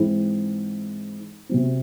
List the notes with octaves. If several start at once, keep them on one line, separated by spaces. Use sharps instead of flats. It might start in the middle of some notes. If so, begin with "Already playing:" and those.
Already playing: G#2 E3 G#3 C4 E4
C3 F#3 C4